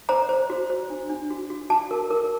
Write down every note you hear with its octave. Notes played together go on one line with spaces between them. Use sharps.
C5 A#5
C5
F#4
C5
D4
D4
F#4
F#4
F#4 A5
A#4
A#4